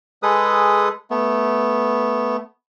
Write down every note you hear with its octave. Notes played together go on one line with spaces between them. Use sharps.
G#3 G#4 A4 B4 D#6
A3 B3